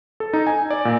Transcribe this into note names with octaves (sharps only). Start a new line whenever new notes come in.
A4
D#4
G#5
D5
A#2